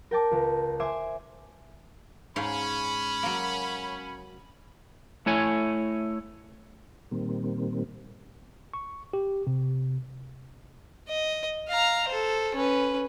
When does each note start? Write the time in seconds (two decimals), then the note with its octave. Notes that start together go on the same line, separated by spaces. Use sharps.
0.11 A#4 G5 A5 D6
0.31 C#2
0.80 C5 E5 G#5 D6
2.36 G#2 C#4 C#5 F5 B5
3.23 F#3 A#3
5.26 A3 E4 C#5 G#5
7.11 A#2 D#3 G3 A#3 C4
8.74 C#6
9.13 G4
9.47 C3
11.08 D#5
11.68 F5 A#5
12.08 A4 C5
12.55 C#4 B4